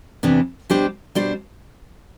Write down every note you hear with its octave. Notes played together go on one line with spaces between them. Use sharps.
E2 C3 E3 B3 D4
B2 G3 D4 G4 C5
B2 G3 D4 G4 C5